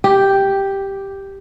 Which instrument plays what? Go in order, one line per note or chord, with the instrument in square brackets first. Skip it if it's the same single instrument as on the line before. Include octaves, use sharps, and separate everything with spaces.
[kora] G4